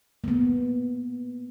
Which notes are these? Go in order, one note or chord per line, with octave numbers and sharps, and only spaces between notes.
A#3
B3